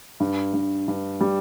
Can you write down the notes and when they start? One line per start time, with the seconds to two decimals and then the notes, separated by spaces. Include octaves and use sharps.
0.20 G2
0.54 G2
0.88 G2
1.21 G3